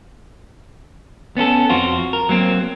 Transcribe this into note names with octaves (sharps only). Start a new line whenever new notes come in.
B3 C#4 E4 A4
F2 C4 F4 F#4
A#4
F#3 A#3 C4